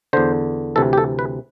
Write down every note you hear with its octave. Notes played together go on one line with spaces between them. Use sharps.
E2 D3 C5
D2 C3 E3 A4
G4
A4
B4